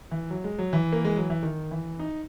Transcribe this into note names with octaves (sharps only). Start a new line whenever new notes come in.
E3
F#3
G#3
F#3
E3
A#3
G#3
F#3
E3
D#3
E3
D#4